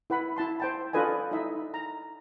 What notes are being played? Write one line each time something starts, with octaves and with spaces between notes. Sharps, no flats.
E4 B4 F#5 B5
E4 A5 C6
C5 G5 A5
D4 F4 A4 B4 D#5 G#5
D#4 E4 D#5 E5
A#5